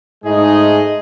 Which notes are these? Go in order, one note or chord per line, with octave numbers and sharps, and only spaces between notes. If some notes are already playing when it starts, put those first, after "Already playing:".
G#2 G#3 A3 D#4 G#4 D#5